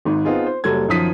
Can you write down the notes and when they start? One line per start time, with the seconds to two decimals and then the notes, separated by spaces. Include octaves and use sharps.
0.05 G#1 G#2
0.25 B3 C4 D#4 F4 G#4
0.46 C5
0.64 F#1 F#3 G3 A4 G#6
0.89 F#2 D#3 F3 D#6 B6 D#7